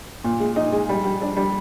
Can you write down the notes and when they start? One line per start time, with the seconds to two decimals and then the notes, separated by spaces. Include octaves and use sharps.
0.24 A#2
0.40 G#3
0.56 D#4
0.72 G#3
0.89 G3
1.05 G3
1.22 D4
1.37 G3